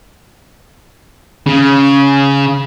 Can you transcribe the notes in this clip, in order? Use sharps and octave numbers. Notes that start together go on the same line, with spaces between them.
C#3